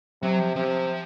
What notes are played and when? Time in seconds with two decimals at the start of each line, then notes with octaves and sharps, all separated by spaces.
0.23 C3 F#3
0.39 F3
0.56 C3 F3